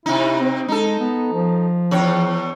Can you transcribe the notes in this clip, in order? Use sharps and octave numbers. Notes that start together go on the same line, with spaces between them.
C3 D#4 E4
C4
G#3 D#4 A4
B3
F3
E2 C#5